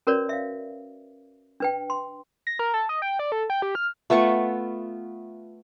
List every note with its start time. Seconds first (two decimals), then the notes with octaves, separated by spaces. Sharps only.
0.07 C#4 F#4 A#4 B4 C#5 D5
0.29 E5 F5
1.60 D4 B4 G5
1.90 C6
2.47 A#6
2.59 A#4
2.74 A4
2.89 D#5
3.02 G5
3.19 D5
3.32 A4
3.50 G5
3.62 G4
3.75 F6
4.10 A3 B3 F4 C#6